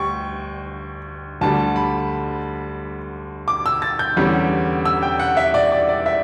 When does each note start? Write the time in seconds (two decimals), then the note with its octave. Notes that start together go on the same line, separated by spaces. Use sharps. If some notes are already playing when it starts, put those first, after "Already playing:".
Already playing: D2 G3 G5 C#6
1.41 D2 D3 G3 A5
1.76 B5
3.48 D6
3.66 E6
3.82 A6
3.99 G6
4.17 E2 D3 G3 C#4
4.85 E6
5.02 G5
5.19 F#5
5.37 E5
5.54 D5
5.72 D5
5.89 D5
6.06 E5